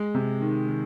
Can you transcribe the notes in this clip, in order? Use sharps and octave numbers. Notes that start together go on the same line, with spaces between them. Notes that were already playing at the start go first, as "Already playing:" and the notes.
Already playing: G#3
C3
D#3
D#3